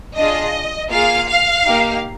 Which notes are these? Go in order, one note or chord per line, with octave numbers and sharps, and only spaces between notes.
D4 F4 G#4 D#5
A#3 F4 G#4 F5
F5
A#3 D#4 G4